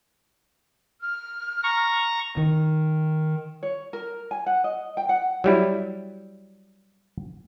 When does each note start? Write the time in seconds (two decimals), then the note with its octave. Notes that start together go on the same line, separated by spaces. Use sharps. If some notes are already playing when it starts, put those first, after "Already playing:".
1.01 F6
1.63 A#5 C#6
2.37 D#3
3.63 C#5
3.93 A#4
4.31 G#5
4.46 F#5
4.64 D#5
4.97 G5
5.09 F#5
5.44 F#3 G3 E4